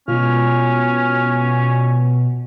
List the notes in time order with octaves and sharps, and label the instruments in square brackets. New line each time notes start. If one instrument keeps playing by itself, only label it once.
[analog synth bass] B2 [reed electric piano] G#3 F4 [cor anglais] C#4 [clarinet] F6